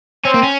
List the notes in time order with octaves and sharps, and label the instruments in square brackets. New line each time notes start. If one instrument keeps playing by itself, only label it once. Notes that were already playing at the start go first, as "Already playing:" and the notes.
[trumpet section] C4 [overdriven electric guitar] C#4
[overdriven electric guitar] A#3
C#4